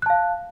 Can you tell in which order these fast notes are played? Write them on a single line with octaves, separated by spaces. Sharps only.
F#6 A5 F5